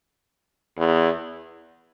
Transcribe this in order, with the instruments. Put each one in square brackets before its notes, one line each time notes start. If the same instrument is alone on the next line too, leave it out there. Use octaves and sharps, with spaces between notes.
[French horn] E2